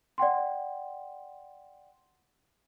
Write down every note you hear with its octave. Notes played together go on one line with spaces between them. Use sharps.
D5 F#5 G5 C6